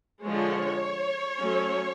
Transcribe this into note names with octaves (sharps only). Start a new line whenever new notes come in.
D3 F3 G#3 C#5
F#3 A3 C#4